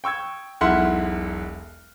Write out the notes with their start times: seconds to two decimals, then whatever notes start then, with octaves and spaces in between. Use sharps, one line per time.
0.04 G5 C#6 E6 G#6
0.61 E1 B1 E4 F#5 C6 F6